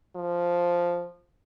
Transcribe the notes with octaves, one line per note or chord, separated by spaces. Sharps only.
F3